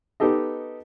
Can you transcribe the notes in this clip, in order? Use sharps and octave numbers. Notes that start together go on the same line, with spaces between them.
B3 D#4 G4 A4 D#5